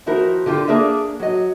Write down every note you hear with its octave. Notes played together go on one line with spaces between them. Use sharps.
D#3 F3 E4 F#4 A#4
D3 F4 G4
A#3 D4 G#4 A#4 D5 E5
F#3 D#5